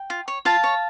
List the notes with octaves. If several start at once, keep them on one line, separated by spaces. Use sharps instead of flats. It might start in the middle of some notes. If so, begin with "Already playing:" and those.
Already playing: G5
F4
C#5
F4 F5 A5
C#5